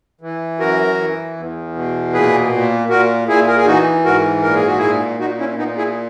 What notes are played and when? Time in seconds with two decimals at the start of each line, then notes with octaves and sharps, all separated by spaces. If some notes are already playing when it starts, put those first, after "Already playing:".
0.21 E3
0.59 F#2 F#4 A#4
0.98 E3
1.37 E2
1.75 B2
2.13 A#2 G#4 B4
2.51 A#2
2.89 A#2 F#4 A#4
3.28 A#2 E4 G#4
3.48 A#4
3.57 G#4
3.66 E3 D#4 F#4
4.05 G#2 F#4 A#4
4.43 A#2 A#4
4.55 G#4
4.67 F#4
4.78 A#2 E4 G#4
5.20 A#2 D#4 F#4
5.39 C#4 E4
5.58 A#2 B3 D#4
5.78 E4 G#4